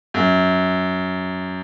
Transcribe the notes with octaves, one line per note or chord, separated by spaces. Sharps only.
F#2